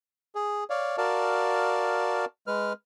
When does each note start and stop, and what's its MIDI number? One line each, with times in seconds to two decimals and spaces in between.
0.35 0.64 68
0.70 0.97 73
0.70 0.97 74
0.70 0.97 77
0.98 2.25 66
0.98 2.25 70
0.98 2.25 74
0.98 2.25 77
0.98 2.25 81
2.47 2.73 56
2.47 2.73 71
2.47 2.73 89